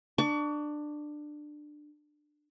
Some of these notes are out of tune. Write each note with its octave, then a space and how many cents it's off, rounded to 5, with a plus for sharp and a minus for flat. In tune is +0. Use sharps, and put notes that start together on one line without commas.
D4 +20 C#6 +40